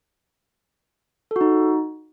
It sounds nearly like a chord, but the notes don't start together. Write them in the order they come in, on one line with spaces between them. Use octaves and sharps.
A4 F#4 D#4